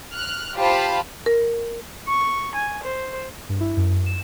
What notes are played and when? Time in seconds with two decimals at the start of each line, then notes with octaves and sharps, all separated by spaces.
0.14 F6 F#6
0.55 F4 G4 C5 F5 A5 B5
1.26 A#4
2.08 C#6
2.54 G#5
2.83 C5
3.49 G2
3.61 E4
3.77 F#2
4.06 E7